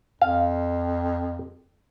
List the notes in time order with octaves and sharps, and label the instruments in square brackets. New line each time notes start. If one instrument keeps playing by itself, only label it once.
[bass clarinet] F2 [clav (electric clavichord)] F5